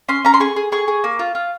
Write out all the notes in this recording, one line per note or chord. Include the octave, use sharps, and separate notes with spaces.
C#4 C6
C#4 A#5
C6
G#4 C#6
G#4
G#4 C#6
G#4
A#3
F4
F4